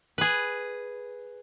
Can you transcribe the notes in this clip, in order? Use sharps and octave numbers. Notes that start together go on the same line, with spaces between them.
G#4 B4